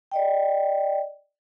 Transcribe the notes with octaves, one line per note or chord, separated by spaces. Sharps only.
D5 D#5 G5